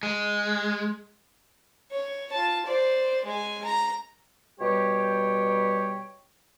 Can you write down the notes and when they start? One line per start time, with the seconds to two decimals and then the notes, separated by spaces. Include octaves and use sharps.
0.03 G#3
1.91 C#5
2.32 F4 A5
2.66 C5 D5
3.25 G#3 G#5
3.65 A#5
4.60 B2 G3 G4 C#5 G5